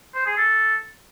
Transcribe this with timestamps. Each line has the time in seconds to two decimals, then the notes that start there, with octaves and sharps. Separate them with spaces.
0.15 C5
0.26 G#4
0.38 A4